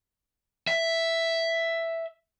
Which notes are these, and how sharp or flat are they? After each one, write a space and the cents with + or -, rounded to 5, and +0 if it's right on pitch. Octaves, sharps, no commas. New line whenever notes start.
E5 +5